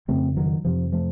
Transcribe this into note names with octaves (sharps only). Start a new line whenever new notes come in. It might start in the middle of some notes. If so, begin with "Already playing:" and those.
F2 C#3 A3 C4
D#3 F#3
F2 C3 F3
F3 A3